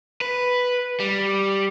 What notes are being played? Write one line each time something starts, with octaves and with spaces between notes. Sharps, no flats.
B4
G3